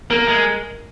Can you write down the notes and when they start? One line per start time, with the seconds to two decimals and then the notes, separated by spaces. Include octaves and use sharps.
0.10 A#3 A#4
0.28 G#3